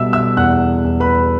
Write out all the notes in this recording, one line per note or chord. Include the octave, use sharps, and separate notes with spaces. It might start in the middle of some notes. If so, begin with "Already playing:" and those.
Already playing: B2 G3 D5 E5 E6
E5 E6
E2 F#5 F#6
E2
B4 B5